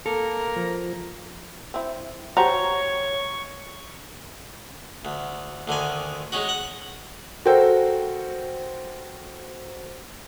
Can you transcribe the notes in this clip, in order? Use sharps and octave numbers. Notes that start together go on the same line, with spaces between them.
A#3 A4 A#4 F6
F3
C4 E4
F#4 G4 C5 C#5 A5 A#5 C#6
D2
D2 D3 D#3 G#5
G#3 C#4 D#4 F#4
F#5
F#4 A4 A#4 C5 G5